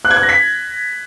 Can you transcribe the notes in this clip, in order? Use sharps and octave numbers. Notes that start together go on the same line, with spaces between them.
F#6
G#6
F#6
A#6
B6